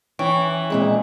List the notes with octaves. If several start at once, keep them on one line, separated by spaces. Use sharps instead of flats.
E3 C#4 G5 C#6
F2 A#2 G#3 C4